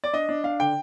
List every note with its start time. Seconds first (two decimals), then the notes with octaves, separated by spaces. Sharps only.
0.04 D5
0.13 D4 D#5
0.29 D4
0.44 D4 F5
0.60 D3 G5